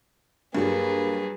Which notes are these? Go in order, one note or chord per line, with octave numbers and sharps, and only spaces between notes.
G2 F#3 G3 A#3 G#4 B4